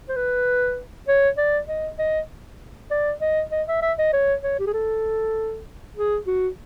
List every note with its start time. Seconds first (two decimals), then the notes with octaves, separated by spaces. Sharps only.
0.09 C5
0.16 B4
1.08 C#5
1.38 D5
1.68 D#5
1.99 D#5
2.91 D5
3.21 D#5
3.52 D#5
3.68 E5
3.82 E5
3.98 D#5
4.13 C#5
4.43 C#5
4.60 G4
4.67 G#4
4.74 A4
5.97 G#4
6.27 F#4